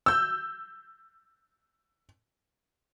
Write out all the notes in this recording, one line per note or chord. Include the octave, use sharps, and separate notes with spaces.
E6 G6